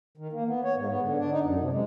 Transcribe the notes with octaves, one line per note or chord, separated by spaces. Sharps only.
D#3
A#3
B3
C#5
G#2
B3
D3
D4
D#4
F#2
C3
G#3